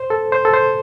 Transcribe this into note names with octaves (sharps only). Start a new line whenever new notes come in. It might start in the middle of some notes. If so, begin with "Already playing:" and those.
Already playing: C5
A4
C5
A4
C5